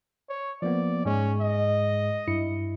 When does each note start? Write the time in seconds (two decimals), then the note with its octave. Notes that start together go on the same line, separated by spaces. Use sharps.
0.29 C#5
0.62 F3 A#3 B3 D5
1.05 G#2 G#3 C#4
1.41 D#5
2.28 G2 E4 C#7